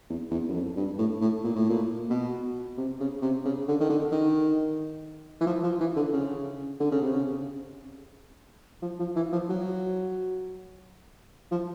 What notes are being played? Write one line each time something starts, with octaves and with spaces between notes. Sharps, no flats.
E2
E2
F#2
F2
G2
A2
A2
A#2
A2
A#2
B2
C3
C#3
C3
C#3
D3
D#3
D3
D#3
E3
F3
F3
E3
D3
C#3
D3
C#3
C3
C#3
F3
F3
E3
F3
F#3
F3